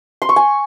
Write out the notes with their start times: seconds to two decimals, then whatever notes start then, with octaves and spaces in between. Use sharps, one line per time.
0.22 C6
0.29 C#6
0.36 G#5